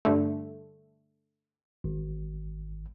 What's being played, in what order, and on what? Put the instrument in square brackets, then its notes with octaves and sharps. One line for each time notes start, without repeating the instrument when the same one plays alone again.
[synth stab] G2 D3 A3
[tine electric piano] G#1